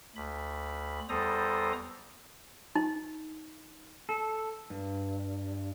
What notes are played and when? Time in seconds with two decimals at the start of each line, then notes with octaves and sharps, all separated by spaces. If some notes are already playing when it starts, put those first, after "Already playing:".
0.16 D2 B5
1.09 E2 G3 A4 C5 A#5 D#6
2.75 D#4
4.09 A4
4.70 G2